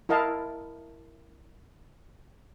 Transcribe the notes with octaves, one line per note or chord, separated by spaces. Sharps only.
E4 A#4 D#5 F5 A5